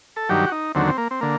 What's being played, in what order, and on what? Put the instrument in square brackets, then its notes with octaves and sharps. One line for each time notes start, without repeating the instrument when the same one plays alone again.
[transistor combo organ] A4
G2 D#3 F#3 G4
F#4
D#4
D#2 D3 F#3 C4
C4
A#3
C4
D3 A#3